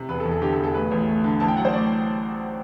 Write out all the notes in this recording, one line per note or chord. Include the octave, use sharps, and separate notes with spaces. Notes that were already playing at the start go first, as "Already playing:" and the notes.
Already playing: C3
E1 B4
A4
E2
A4
D3 G4
A4
E1
A4
A3 B4
A1
A3
D3
A1 A5
G5
F#3 F#5
C5
A2 D5